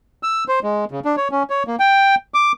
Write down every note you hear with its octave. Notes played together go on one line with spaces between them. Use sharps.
E6
C5
G#3
C#3
D4
C#5
C#4
C#5
A#3
G5
D6